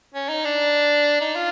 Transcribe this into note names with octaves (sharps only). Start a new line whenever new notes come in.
C#4
D#4
D4
D#4
F4